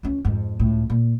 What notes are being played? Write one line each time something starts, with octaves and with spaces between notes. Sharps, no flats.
C#2 C#4
F2 G#2
C#2 A2
A#2